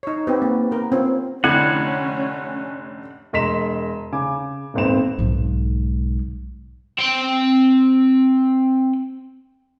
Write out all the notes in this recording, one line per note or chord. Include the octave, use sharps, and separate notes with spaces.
D#4 C#5
B3 C4 G4
A#3
B3 A#4
C4 C#4 F4
F1 D3 C#4 E4 F#5 G#6
E1 D#5 C6 B6 E7
C#3 G#5 D6
D#1 G#1 B3 C4 E7
B1 G#2
C4 G5